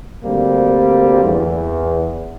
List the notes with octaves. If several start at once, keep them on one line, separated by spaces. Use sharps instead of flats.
D2 G3 A#3 C4
E2